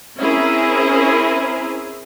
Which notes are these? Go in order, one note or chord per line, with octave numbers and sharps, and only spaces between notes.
C4 C#4 E4 G#4 A#4 C5